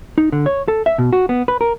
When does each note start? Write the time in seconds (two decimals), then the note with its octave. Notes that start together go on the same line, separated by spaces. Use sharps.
0.18 D#4
0.32 D3
0.46 C#5
0.68 A4
0.86 E5
0.98 B2
1.13 F#4
1.29 B3
1.48 B4
1.61 A#4